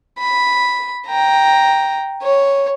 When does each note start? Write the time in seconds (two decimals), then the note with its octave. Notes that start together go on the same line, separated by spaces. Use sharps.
0.18 B5
1.07 G5 A#5
2.22 C#5